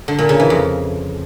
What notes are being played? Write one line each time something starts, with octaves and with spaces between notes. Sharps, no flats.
D3
A#2
C#3
E3
F2